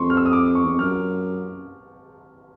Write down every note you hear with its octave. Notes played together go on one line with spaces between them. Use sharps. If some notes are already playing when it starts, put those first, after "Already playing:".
Already playing: F2 C6 C#6
F6
E6
D#6
D6
C#6
E2
F2
F#2 F6